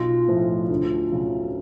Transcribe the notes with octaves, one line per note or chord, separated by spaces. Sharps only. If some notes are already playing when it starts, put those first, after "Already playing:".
Already playing: B1 F4
A2 F3
D2
C#3 F#3